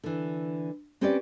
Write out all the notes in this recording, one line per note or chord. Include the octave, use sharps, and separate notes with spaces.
D3 E3
C4 C#4 G4 B4 C5 D5